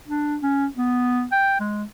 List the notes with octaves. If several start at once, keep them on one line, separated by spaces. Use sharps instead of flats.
D4
C#4
B3
G5
G#3